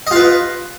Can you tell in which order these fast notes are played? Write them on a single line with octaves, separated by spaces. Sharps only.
D#5 F4 B4